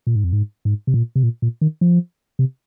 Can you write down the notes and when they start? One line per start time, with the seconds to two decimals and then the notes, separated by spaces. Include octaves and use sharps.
0.07 A#2
0.16 G#2
0.24 F2
0.33 G#2
0.65 G#2
0.87 C3
0.94 A#2
1.16 C3
1.23 A#2
1.42 A#2
1.61 D#3
1.81 F3
2.39 C3